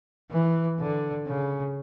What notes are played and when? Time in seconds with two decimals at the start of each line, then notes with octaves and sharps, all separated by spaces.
0.31 E3
0.79 D3
1.27 C#3